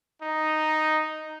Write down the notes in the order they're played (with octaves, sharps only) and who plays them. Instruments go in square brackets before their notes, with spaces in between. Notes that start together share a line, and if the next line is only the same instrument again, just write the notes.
[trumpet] D#4